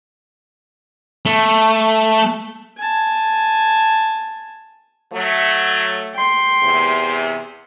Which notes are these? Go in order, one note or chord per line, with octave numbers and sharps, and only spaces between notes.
A3
G#5 A5
F#3 A3
G5 C6
E2 C3